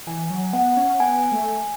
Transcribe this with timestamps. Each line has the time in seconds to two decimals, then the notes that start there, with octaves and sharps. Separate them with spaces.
0.07 E3 G#5
0.30 F#3
0.53 B3 F#5
0.77 C#4
1.00 B3 G#5
1.32 A3